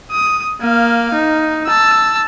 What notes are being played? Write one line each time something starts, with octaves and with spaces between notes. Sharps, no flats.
D#6
A#3 F5
D#4
A5 E6